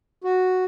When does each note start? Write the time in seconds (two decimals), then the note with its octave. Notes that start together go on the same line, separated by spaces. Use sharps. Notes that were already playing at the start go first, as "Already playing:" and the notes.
0.24 F#4